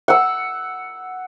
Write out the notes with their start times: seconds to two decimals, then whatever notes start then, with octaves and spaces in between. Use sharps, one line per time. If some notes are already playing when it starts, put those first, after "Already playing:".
0.08 F#5 E6